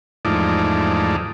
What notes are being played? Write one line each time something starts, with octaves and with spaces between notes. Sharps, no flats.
E2 G#2 F3 A3 D#4 D5